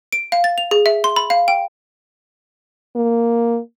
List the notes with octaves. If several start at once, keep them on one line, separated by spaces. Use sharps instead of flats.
D7
F5
A6
F7
G#4
E5
C6
B5
F5
G5
A#3